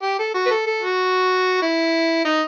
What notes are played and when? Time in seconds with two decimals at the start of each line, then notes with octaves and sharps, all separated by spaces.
0.02 G4
0.19 A4
0.34 F#4
0.46 B4
0.50 A4
0.66 A4
0.82 F#4
1.62 E4
2.25 D#4